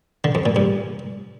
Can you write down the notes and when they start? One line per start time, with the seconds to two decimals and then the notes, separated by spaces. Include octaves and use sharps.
0.24 D3
0.35 F2
0.46 A#2
0.56 G2